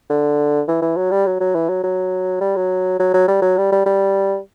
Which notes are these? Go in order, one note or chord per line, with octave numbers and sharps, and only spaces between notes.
D3
E3
E3
F#3
G3
F#3
F#3
E3
F#3
F#3
G3
F#3
F#3
F#3
G3
F#3
G3
G3
G3